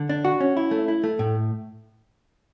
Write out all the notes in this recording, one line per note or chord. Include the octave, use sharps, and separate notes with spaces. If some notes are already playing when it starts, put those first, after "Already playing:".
Already playing: D3
D4
F#4
C#4
E4
A3
E4
A3
A2